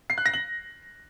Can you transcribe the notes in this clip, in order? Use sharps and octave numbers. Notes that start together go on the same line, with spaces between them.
C7
F#6
A#6
F#7